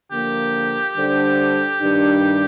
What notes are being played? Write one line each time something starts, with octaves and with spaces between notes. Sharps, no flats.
D3 F3 A#3 G4
D3 G3 D4 A4 C5
G2 D#3 G3 D4